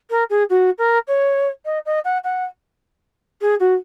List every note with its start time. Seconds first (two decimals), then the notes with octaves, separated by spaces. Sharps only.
0.10 A#4
0.30 G#4
0.50 F#4
0.78 A#4
1.07 C#5
1.65 D#5
1.86 D#5
2.04 F#5
2.24 F#5
3.41 G#4
3.60 F#4